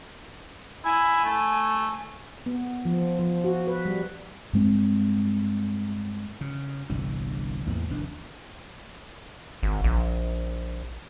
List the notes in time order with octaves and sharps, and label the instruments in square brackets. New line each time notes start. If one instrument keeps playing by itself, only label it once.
[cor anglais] E4 [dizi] G#5
[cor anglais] A3
[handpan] B3
F3
F3
F#4
B4
G3
[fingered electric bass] G2 G#3 C4
[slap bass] C#3
G1 C2 G2 E3
A1 E2 A2 A#3
F1 D#2 D#3 D4
[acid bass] G#1
A#1